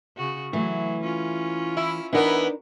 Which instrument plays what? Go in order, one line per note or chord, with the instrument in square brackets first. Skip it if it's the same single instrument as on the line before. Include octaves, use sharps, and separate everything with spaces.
[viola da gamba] C#3 F#4
[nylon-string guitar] E3 A3 [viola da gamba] F#3
[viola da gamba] C#4 F4
[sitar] E4
[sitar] E3 B3 [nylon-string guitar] D4 D#4 A#4